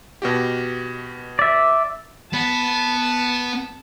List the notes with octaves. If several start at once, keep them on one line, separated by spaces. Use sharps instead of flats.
B2 F#4 G4
D5 E5
B3 A5